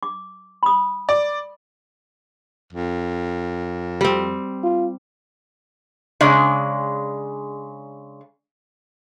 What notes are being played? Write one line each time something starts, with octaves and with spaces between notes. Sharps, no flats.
D6
B5 D#6
D5
F2
G3 C4
F4
C#3 G#3 D4